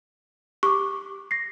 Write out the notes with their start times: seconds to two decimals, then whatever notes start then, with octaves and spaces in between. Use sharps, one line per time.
0.63 G4 C#6 D6
1.31 A#6 C7